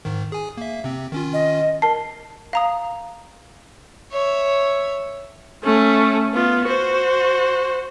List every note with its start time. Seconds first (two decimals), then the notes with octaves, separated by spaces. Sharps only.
0.05 G#2 D#3
0.32 G#4 G#5
0.57 A#3 E5
0.84 C3 C4
1.12 D#3 C#4 F4
1.33 D#5
1.82 A#4 A5 C7
2.53 F5 A#5 D#6
4.11 C#5 E5
5.64 A3 C#4
6.33 B3 F4
6.65 F#4 C5